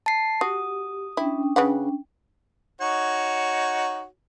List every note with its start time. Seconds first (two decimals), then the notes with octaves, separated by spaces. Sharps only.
0.06 A5 C7
0.41 F#4 G4 D#6
1.17 C#4 D4 E4 G5
1.56 C#3 B4 F#5
2.81 D#4 F#4 C#5